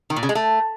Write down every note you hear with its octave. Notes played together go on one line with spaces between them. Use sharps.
D#3
A#2
C#3
G#3
A3